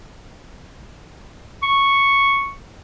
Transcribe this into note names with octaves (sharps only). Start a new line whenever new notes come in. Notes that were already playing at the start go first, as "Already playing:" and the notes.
C#6